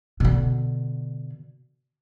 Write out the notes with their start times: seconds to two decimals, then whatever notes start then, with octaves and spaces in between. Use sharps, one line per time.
0.20 B2 D3